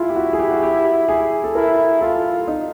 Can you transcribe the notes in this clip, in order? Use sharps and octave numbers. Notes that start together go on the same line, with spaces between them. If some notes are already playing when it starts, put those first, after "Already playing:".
Already playing: E4 F4 G#4
G4
F#4
G#4
G4
F#4
G4
G#4
A4
E4 A#4
F4 A4
D#4